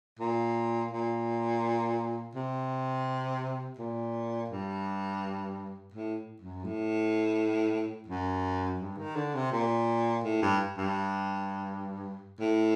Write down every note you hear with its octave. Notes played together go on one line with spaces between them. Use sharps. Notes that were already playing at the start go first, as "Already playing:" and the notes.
A#2
A#2
C3
A#2
G2
A2
F#2
A2
F#2
G2
D#3
D3
C3
A#2
A2
G2
G2
A2